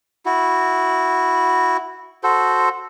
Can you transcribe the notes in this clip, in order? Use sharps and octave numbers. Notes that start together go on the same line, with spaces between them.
E4 F#4
F#4 A4 C5